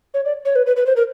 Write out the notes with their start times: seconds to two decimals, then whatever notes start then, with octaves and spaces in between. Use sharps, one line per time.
0.14 C#5
0.25 D5
0.45 C#5
0.56 B4
0.66 B4
0.76 B4
0.86 C5
0.96 A#4